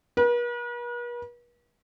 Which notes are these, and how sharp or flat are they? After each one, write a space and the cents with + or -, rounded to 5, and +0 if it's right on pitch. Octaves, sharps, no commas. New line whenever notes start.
B4 -45